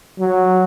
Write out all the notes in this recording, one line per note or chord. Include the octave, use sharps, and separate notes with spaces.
F#3